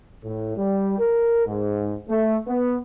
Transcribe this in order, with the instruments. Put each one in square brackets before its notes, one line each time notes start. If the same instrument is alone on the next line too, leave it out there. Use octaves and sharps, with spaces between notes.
[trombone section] A2
G3
A#4
G#2
A3
B3